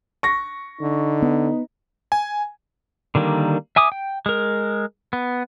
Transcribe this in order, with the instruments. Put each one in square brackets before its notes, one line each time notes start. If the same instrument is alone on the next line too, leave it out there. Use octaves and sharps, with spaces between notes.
[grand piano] C#6 A#6
[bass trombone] D3 [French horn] D#4
[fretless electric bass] B3
[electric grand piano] G#5
[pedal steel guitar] D3 D#3 G3 A#3
E5 G#5 D6 D#6
G5
G#3 A#4
B3